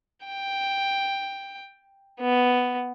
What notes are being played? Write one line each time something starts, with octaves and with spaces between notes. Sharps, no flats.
G5
B3